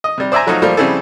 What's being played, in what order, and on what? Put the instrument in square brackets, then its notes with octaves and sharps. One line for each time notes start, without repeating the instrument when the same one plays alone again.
[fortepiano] D#5
C3 G3
C5 D5 E5 G#5 A#5
F3 F#3 A3 D#4 F4
F3 G3 A3 A#3
C#3 G3 C4 E4 G#4 A4